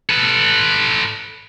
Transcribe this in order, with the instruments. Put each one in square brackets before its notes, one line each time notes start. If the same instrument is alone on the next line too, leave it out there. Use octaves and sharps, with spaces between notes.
[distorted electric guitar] A4 B4